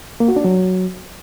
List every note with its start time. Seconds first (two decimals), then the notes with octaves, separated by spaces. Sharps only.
0.20 A#3
0.28 F#4
0.36 D4
0.44 F#3